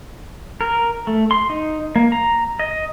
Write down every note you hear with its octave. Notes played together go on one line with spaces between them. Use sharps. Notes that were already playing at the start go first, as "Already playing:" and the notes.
A#4
A3
C6
D#4
A#3
A#5
D#5